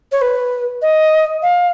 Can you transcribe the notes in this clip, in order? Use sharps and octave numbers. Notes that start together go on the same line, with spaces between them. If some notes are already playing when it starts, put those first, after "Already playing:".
C#5
B4
D#5
F5